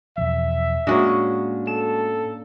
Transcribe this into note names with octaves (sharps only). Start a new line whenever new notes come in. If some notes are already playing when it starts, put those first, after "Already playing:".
E2 B2 F3 E5
A2 G#3 A#3 C#4 D4 F#4
A4 E7